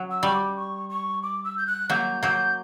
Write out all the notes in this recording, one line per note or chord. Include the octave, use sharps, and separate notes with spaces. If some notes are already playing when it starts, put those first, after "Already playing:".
Already playing: F#3
E6
G3 C#6
D6
C#6
C#6
D6
E6
G6
F#6
F#3 A#3 G6
F#3 A#3 G6